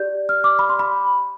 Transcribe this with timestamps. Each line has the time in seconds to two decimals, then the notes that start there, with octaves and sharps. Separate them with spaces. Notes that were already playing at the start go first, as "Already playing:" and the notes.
Already playing: G4 D5 G6
0.29 F6
0.44 D6
0.59 B5
0.69 C6
0.79 B5